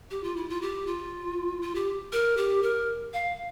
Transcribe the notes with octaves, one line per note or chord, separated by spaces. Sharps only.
G4
F4
E4
F4
G4
F4
F4
G4
A#4
G4
A#4
F5